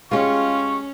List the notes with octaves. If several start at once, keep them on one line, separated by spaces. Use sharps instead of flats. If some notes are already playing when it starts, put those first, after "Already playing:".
G#3 C#4 F4 G4 C#6